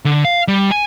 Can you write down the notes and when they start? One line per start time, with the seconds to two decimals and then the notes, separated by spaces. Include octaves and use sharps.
0.05 D3
0.25 F5
0.48 G3
0.71 G#5